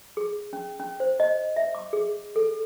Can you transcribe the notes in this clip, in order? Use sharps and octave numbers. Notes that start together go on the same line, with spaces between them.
G#4
C#4
C#4
C5
D#5
E5
D6
G#4
A4